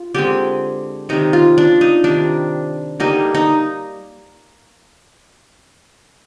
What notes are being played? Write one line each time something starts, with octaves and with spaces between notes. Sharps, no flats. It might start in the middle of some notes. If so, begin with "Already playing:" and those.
Already playing: F4
D3 G#3 C4 G4
C3 D#3 G3 D#4
F4
D4
D#4
C3 D#3 G3 D4
D3 G3 A#3 D#4
D#4